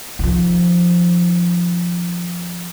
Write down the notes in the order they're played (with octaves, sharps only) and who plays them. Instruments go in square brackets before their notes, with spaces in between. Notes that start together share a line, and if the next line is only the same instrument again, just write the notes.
[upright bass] D#3 F3